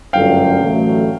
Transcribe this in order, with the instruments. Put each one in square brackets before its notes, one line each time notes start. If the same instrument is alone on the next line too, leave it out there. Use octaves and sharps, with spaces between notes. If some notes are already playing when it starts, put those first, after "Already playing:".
[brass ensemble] G1 F#2 D3 F#3 A3 [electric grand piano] F5 G5
[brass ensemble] A1 A2 F#3 A3